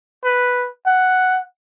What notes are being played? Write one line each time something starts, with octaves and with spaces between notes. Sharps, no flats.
B4
F#5